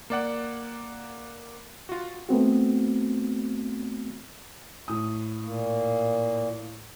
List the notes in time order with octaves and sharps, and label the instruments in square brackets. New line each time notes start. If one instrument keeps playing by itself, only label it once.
[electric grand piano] A#3 D5 F#5
F4 F#4
[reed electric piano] A3 B3 C4 F#4
[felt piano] A2 D#6
[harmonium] A#2 A#3